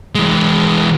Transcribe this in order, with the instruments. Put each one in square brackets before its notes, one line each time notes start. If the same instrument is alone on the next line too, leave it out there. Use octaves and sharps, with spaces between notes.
[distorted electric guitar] E3 G#3